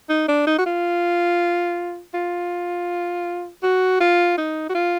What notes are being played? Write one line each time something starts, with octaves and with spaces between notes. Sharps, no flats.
D#4
D4
D#4
F#4
F4
F4
F#4
F4
D#4
F#4
F4